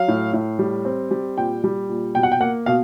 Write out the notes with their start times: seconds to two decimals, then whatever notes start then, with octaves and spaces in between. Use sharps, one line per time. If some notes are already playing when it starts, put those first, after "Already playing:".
Already playing: F#3 F5
0.08 A2
0.33 A2
0.59 G3
0.85 C4
1.11 G3
1.37 A#2 G5
1.64 G3
1.89 A#2
2.15 B2 G5
2.23 F#5
2.32 G5
2.40 A#3 F#5
2.66 B2 F5